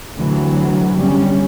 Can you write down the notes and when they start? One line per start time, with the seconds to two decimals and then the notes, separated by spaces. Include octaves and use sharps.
0.16 D2 C3 E3 F#3
0.97 G1 G3 C#4